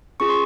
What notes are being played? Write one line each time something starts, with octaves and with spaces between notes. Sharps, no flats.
C#4 F4 G#4 C#6
C6